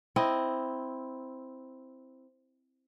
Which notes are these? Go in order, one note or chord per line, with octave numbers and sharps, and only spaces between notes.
C4 E4 D#5